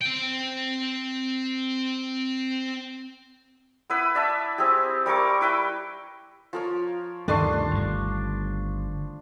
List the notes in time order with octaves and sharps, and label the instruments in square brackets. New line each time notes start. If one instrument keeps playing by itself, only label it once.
[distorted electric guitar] C4 G5
[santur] B3 E4 B4
D5 E5 A5
C4 E4 G4 G#4
G3 A#4 C#6 D6
E4 B4 G5
F3 A#4 C#5
[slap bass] D2 G2 C3 [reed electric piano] D#3 A3 [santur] D4 C6 C#6
[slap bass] G1 G2